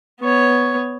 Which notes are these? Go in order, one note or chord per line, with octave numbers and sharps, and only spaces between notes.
B3 C#5